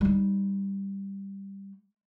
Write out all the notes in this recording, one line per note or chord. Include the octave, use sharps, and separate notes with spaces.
G3 D#4